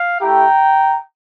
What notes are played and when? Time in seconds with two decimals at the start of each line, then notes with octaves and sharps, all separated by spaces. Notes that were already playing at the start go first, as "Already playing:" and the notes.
Already playing: F5
0.21 A3 E4 G4 G5 A#5